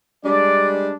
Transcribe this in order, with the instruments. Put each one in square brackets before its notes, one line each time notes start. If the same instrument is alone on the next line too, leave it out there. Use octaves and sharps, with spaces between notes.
[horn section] G3 G#3 D4 [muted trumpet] D5